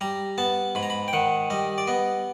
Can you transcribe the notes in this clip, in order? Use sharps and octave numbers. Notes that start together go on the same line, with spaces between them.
G3 A#5
B3 A5
G#2 B5
A#5
B5
G5
D#3 F#5
G3 D#5
D5
B3 D#5